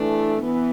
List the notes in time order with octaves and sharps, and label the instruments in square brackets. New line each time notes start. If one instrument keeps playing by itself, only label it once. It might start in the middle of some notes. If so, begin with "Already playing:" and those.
Already playing: [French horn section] E3 A3 [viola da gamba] D4
[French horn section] E3 [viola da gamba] B3